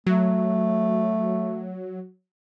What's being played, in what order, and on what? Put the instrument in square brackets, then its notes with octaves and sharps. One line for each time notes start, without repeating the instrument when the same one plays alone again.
[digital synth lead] F#3 [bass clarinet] A3